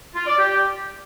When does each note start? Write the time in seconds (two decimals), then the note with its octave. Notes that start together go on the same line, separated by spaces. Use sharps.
0.14 F4
0.26 D5
0.38 G4